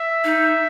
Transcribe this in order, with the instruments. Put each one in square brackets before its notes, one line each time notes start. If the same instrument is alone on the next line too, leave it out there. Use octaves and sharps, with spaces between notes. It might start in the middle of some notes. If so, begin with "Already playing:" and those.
Already playing: [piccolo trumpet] E5
[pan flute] D#4